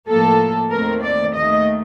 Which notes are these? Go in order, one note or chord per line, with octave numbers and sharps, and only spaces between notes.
A2 F3 A#3 A4
D#2 D#3 A3 C4 A#4
D5
D#2 D#3 A3 D#5